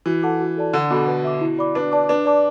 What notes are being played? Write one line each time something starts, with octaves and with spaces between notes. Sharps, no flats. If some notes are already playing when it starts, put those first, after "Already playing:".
E3 F#4
A4 F#5 A5 D6
F#4
A4 D5 A5
D3 D4
B2 A4 F#5 B5 D6
B4
E5 D6
E4
D5 B5 D6
D4 B4
D5 A5 D6
D4 B4
D5 A5 D6